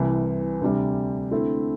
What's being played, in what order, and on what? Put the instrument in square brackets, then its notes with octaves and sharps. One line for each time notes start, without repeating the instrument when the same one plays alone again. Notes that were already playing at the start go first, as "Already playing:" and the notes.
Already playing: [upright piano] C2 C3 E3
D2 C3 G3
D3 A3 C4 E4 A4